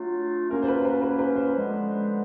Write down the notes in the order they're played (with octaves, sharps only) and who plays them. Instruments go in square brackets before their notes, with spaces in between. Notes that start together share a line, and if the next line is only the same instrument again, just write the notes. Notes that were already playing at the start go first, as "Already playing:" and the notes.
Already playing: [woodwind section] F#3 A3 D4 F4
[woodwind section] F#3 A#3 C#4 [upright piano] A#4
[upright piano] C5
B4
B4
B4
B4
C5
[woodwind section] D3 F3 G#3 B3